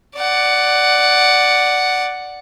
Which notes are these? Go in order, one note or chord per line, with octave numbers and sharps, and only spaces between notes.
D5 F#5